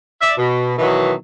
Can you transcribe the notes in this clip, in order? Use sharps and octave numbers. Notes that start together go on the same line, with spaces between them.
D5 E5
B2
B2 D#3 E3 F#3 B3